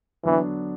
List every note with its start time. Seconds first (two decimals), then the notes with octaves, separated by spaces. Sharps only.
0.24 D3 E3 F#3 B3 D4